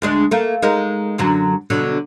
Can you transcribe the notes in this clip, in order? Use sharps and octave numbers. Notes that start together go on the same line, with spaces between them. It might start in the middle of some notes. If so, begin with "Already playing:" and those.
D2 G#3 D4
A3 A#3
G#3 D#4 A#4
F#2 D3 F#3
B2 D3 F#3